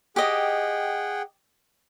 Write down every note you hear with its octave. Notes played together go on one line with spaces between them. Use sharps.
G4 G#4 D#5 F#5 G5